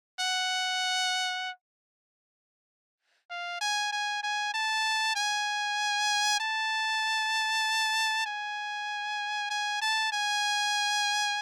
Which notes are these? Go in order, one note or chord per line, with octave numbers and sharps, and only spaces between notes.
F#5
F5
G#5
G#5
G#5
A5
G#5
A5
G#5
G#5
A5
G#5